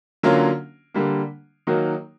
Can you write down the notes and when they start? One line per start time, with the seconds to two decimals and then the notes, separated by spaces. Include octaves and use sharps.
0.23 D3 F#3 A#3 C#4 F4
0.94 D3 G3 A#3
1.67 D#3 F#3 A#3 D#4 F#4